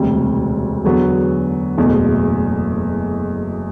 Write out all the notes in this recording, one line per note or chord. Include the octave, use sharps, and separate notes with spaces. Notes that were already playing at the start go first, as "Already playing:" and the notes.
Already playing: E1 D2 C3 G3
E2 D3 F#3 B3 F#4
F#1 E2 B2 A3